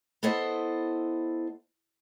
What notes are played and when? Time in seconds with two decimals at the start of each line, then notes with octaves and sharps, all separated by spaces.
0.23 B3 E4 A4 C5 D#5